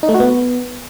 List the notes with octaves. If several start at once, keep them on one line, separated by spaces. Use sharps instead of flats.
D#4
A3
F#4
B3